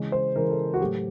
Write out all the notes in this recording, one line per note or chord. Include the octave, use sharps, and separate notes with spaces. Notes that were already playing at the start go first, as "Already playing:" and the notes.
Already playing: C#3 E3 G#3
C5
C#3 E3 G#3 A#4
A4
F#4
A2 F#3 A3 G4